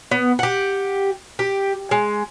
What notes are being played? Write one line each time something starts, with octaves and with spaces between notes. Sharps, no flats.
B3
G4 F#5
G4
G#3